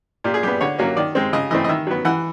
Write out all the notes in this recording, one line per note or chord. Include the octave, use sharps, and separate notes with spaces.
A#2 G4
G#4
G3 B3 G4
D3 C#5
F#3 A#3 C#4
D#3 D5
G#3 C4
C#3 D#5
E3 A3 C4 D#5
D#5
D#3 E5
F#3 B3
E3 F#5